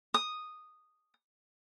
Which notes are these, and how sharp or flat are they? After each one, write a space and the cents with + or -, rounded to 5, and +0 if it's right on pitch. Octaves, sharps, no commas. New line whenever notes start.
D#6 -5